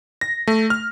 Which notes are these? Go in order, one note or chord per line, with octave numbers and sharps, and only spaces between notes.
A#6
A3
F6